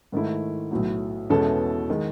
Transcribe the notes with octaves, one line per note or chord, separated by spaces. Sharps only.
G#2 D#3 A3 E4
B1 A2 F#3
E2 B2 G#3 C#4 E4 A4
D#3 G#3